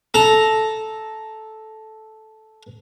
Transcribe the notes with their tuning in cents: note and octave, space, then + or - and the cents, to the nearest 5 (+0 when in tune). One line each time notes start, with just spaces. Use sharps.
A4 -10 A#5 +0